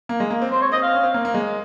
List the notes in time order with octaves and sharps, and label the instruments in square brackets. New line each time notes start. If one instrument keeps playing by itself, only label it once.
[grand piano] A#3
G#3
A#3
C4
[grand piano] C4 [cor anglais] C5
[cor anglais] C#5
[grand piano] C4 [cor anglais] D#5
[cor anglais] F5
[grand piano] C#4
C4
A#3
A#3
G#3